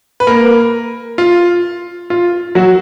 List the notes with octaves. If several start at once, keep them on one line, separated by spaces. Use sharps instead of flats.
B4
A#3 A#4
F4
F4
F#3 F#4